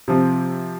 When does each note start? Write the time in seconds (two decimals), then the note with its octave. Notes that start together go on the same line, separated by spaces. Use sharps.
0.08 C3 F3 C4